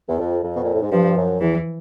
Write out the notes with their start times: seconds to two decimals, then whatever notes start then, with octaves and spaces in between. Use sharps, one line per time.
0.09 E2
0.19 F2
0.43 F2
0.55 B2
0.64 A#2
0.73 A2
0.82 G#2
0.91 G2 F3
1.16 F#2
1.41 E2 E3